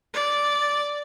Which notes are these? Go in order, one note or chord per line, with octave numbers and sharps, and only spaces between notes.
D5